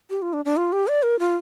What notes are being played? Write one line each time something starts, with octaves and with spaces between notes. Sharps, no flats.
G4
F4
D4
D4
F4
G4
D5
A#4
F4